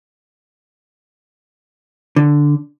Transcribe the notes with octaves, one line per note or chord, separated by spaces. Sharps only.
D3